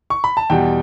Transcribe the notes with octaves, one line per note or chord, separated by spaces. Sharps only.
C#6
B5
A5
E2 B2 G3 G5